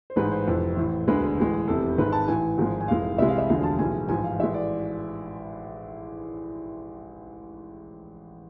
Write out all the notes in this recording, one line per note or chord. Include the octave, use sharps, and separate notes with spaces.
C5
A1 G#2 G#3 B4
C5
F1 F2 E3
A1 A2 E3
E1 D2 D3 G#3 B4
B4
A1 A2 G#3
F1 E2 C3 A4
G#1 G#2 G#3 B4
A5
A1 A2 E3 G#5
G#1 G#2 F3 G#3
G#5
F1 F2 E3 G#3 F5
C2 C3 E3 G#3 E5
F5
E5
E1 D2 D3 F3 G#3 F5
A5
B1 A2 E3 G#3 G#5
A1 G#2 F3 G#5
F5
A1 A2 E3 G#3 E5
D5